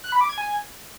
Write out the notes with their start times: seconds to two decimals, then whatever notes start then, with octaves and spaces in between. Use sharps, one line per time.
0.04 F#6
0.12 B5
0.21 D6
0.29 G#6
0.38 G#5